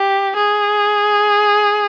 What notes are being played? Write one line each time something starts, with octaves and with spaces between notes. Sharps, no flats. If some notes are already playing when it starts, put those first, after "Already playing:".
Already playing: G4
G#4